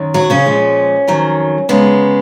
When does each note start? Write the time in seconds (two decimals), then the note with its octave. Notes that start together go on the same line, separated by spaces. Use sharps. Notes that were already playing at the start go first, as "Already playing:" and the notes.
Already playing: F#2 D#3
0.14 F#3 F#4
0.30 C#3 C#4
0.46 A#2 F3 G#3
1.08 F2 D#3 F#3
1.69 F#2 C#3 G#3 B3